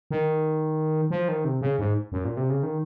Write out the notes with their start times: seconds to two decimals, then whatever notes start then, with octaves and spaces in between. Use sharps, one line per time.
0.11 D#3
1.10 F3
1.28 D#3
1.45 C3
1.61 C#3
1.79 G#2
2.12 F#2
2.25 A#2
2.37 C3
2.50 C#3
2.63 D#3